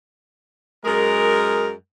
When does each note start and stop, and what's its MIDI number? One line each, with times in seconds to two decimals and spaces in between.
0.84 1.72 42
0.84 1.72 56
0.84 1.72 68
0.84 1.72 70